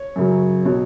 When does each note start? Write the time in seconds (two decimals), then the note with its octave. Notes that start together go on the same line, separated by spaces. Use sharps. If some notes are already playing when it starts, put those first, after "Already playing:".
Already playing: C#5
0.16 F#2 C#3 F#3
0.65 B2 F#3